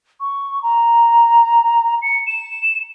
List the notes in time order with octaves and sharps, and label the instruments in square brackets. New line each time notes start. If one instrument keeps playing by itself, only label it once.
[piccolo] C#6
A#5
C#7
E7